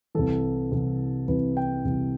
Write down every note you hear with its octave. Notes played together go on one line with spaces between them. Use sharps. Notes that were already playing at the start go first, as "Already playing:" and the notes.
C2 C3 E3 A4
C2 C3 E3
C2 C3 E3 B4
G5
C2 C3 E3